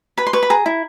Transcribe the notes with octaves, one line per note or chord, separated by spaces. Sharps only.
B4 B5
C6
B4 C#6
B5
G#4 A#5
E4